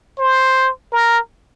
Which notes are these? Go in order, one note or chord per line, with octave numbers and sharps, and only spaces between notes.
C5
A#4